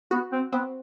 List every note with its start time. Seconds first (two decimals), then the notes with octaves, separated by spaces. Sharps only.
0.11 B3 F#4
0.32 C4
0.52 B3 C4